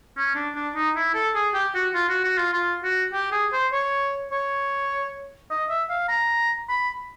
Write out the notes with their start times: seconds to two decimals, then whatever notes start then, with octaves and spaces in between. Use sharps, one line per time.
0.17 C#4
0.35 D4
0.55 D4
0.75 D#4
0.96 E4
1.14 A4
1.35 G#4
1.54 G4
1.75 F#4
1.94 F4
2.09 F#4
2.24 F#4
2.38 F4
2.53 F4
2.84 F#4
3.13 G4
3.32 G#4
3.53 C5
3.72 C#5
4.31 C#5
5.50 D#5
5.70 E5
5.89 F5
6.08 A#5
6.69 B5